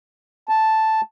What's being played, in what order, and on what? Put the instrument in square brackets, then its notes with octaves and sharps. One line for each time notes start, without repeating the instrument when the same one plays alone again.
[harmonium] A5